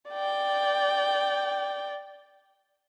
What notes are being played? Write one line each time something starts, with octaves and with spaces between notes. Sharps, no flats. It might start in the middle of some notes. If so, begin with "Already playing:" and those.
D5 G5